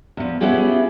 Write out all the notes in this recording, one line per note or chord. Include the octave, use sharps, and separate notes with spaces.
E2 F3
B3 C#4 E4 F4 G4 G#4